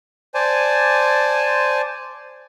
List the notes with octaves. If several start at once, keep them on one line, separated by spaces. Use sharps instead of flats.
C5 D5 G#5 A5